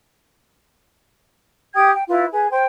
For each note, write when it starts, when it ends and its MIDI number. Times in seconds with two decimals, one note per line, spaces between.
1.74 1.90 67
1.74 1.90 79
1.74 1.90 87
1.74 1.90 92
1.94 2.03 79
2.08 2.25 64
2.08 2.25 65
2.08 2.25 71
2.32 2.46 68
2.32 2.46 71
2.50 2.66 72
2.50 2.66 79